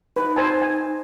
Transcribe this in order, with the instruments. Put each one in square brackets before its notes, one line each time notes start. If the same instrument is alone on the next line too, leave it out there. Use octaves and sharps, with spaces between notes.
[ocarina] D#4 [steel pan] B4
[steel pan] C5 G#5 A5
G#5